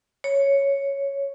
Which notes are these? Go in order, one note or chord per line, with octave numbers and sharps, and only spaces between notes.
C#5